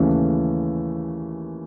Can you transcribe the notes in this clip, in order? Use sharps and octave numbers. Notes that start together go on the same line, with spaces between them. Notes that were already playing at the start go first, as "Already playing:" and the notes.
Already playing: D#2 C#3 E3 A3